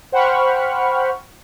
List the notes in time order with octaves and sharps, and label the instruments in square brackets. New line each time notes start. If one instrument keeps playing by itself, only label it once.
[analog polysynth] C5 F#5 G5 B5 C#6 F6